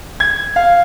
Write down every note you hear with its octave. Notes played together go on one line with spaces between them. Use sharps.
G#6
F5